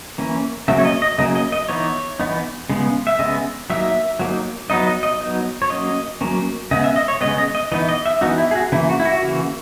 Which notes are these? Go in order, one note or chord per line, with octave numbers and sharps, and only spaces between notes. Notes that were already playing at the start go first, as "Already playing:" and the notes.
E3 A#3 C#4
C#3 F#3 A#3 E5
C#5
D#5
D#5
C#3 F#3 A#3 D#5
D#5
D#5
E3 B3 D#4 C#5
E3 B3 D#4
C#3 G#3 B3
E5
C#3 G#3 B3 D#5
F#3 A#3 D#4 E5
F#3 A#3 D#4
F#3 B3 D#4 D#5
D#5
D#5
F#3 B3 D#4
C#5
F#3 A#3 C#4 D#5
F#3 A#3 C#4
C#3 G#3 B3 D#5
E5
D#5
C#5
C#3 G#3 B3 D#5
D#5
D#5
E3 B3 D#4 D#5
D#5
E5
E3 B3 D#4 F#4
E4
G#4
F#4
C#3 E3 A#3 E4
F#4
E4
F#4
C#3 E3 A#3